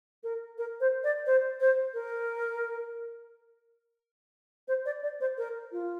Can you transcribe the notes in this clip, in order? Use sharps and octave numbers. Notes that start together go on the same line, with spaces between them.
A#4
A#4
C5
D5
C5
C5
A#4
C5
D5
D5
C5
A#4
F4